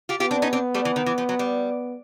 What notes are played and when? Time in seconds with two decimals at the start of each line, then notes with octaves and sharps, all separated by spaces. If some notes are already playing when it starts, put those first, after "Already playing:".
0.09 F4 G4
0.20 B3 F4 G4
0.31 C4 D4
0.42 C#4 D#4
0.53 C4 D4
0.74 G3 A3
0.85 E3
0.96 D#3
1.06 E3
1.18 F3
1.29 F#3
1.39 G3